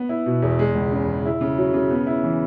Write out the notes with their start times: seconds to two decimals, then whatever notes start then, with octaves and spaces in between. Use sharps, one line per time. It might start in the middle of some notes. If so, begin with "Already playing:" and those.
Already playing: B3
0.09 E4
0.26 B2
0.42 E2
0.59 G#3
0.75 C#2
0.92 C#3
1.08 C#2
1.25 E4
1.41 C#3
1.58 F#3
1.74 C#3
1.91 B3
2.07 E4
2.24 E3